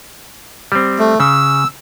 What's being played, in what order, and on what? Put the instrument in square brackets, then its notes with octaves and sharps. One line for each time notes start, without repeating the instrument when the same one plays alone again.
[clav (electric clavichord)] G3 C4
[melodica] A3
[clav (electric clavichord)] C#3 [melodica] E6